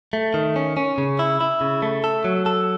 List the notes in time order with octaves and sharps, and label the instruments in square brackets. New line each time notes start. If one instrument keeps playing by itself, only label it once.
[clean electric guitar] A3
D#3
C#4
C#4
C#3
E4
E4
C#3
A3
A4
F#3
A4